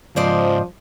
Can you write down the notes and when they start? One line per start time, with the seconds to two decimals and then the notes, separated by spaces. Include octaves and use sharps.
0.16 G#2 C#3 F3 C5 D5 D#5